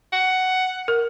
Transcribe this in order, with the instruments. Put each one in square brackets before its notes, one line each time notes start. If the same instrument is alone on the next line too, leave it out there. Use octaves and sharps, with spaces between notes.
[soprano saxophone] F#5
[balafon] A#4